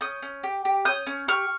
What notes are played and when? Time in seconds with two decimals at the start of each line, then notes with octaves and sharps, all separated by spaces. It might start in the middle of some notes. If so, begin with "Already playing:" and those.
0.01 C#4 D#6 G6
0.22 C#4
0.44 G4
0.65 G4
0.85 C#4 D#6 G6
1.07 C#4
1.28 G4 C#6 F6